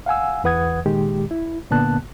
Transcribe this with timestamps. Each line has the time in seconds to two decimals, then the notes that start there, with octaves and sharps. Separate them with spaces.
0.06 F5 F#5 G#5 E6
0.44 E2 E3 B4 F#5 D#6 G#6
0.86 A#2 D#3 G#3 G4
1.31 E4
1.71 A#2 D3 A#3 B3 A5 F#6